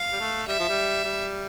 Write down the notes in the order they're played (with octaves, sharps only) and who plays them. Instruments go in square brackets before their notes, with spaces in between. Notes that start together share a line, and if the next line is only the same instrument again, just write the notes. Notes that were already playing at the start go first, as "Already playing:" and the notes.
Already playing: [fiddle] F5
[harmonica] G3
A3
[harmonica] G3 [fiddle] E5
[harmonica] F3
G3
G3